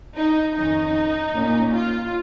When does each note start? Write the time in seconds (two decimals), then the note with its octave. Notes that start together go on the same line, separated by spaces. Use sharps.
0.17 D#4
0.56 F2 D#3 C#4 D#4
1.34 A#2 A#3 C#4
1.73 F4